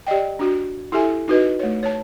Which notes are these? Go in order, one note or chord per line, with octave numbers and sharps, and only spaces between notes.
G4 D5 D#5 G5
D4 F#4
E4 G4 A4 E5 G#5
D#4 F#4 B4 D#5
A3 C#5
C#5 A5